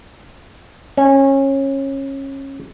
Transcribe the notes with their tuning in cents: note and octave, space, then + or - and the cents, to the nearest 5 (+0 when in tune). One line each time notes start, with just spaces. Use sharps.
C#4 -25